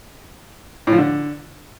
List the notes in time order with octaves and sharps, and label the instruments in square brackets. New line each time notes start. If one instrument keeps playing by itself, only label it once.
[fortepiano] A2
F3
D3